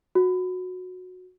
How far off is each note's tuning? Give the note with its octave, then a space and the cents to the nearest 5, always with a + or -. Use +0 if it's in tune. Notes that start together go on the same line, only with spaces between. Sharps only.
F#4 -15